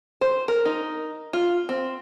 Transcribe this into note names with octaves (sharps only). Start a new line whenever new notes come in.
C5
A#4
D#4
F4
C4